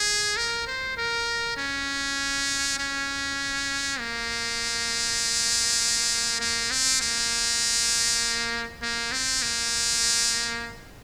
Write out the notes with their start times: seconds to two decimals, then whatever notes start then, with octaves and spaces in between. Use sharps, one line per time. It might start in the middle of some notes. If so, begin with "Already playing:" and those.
Already playing: G#4
0.37 A#4
0.67 C5
0.98 A#4
1.57 C#4
2.79 C#4
4.00 A#3
6.40 A#3
6.71 C4
7.01 A#3
8.83 A#3
9.12 C4
9.43 A#3